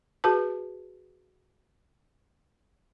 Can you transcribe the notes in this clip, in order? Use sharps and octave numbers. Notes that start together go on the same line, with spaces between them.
F#4 G#4 B4 A5